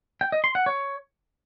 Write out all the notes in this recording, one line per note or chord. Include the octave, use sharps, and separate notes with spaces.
G5
D#5
C6
F#5
C#5